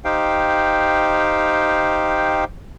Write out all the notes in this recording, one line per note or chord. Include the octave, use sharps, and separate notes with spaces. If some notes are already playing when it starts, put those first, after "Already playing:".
D#4 G4 C5 F5 G5